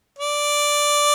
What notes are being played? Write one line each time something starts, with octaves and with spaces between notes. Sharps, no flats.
D5